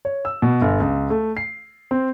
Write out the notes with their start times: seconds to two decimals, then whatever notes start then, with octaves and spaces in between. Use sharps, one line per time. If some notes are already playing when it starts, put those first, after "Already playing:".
0.05 C#5
0.25 E6
0.42 B2
0.62 G1
0.80 C#2
1.10 A3
1.37 C7
1.91 C4